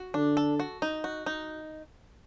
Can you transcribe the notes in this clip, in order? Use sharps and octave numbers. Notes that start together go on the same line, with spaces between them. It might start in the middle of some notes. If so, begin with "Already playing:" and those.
Already playing: F#4
D3 D4
A4
F#4
D#4
F#4
D#4